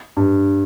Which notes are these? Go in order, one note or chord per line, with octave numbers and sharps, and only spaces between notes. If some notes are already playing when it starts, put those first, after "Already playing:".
G2